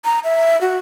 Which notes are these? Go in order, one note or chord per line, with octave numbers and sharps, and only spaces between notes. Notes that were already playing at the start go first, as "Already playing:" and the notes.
A#5
E5
F#4